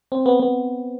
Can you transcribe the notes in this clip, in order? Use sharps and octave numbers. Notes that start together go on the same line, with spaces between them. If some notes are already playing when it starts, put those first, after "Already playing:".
C4
B3
B3